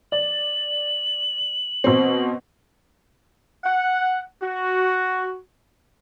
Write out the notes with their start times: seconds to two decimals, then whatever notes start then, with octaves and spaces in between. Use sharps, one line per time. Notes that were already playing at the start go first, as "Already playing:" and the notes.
0.12 D5 F#7
1.84 B2 C4
3.64 F#5
4.41 F#4